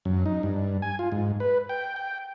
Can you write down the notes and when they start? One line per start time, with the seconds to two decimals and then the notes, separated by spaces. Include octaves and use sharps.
0.05 F#2
0.26 D#4
0.43 G2
0.82 G#5
0.99 F4
1.12 G#2
1.40 B4
1.69 G5
1.96 G5